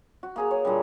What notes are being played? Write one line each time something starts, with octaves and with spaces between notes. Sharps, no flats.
F#4
A#3 G#4 A#5
C#5
A#2 D3 G3